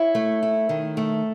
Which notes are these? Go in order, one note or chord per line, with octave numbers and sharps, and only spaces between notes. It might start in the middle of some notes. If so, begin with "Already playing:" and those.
Already playing: E4 C#5
A3
E4
D#3
A3